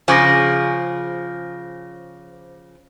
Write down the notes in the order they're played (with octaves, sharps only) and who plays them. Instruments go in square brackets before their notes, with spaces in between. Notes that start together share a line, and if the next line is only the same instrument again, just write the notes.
[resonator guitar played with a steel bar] C#3 F3 [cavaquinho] G#4 [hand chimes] C5 D6 A#6